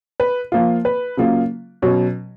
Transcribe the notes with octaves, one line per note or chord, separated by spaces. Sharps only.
B4
F3 A#3 F4
B4
C#3 F#3 A#3 F4
B2 F#3 C#4 C#5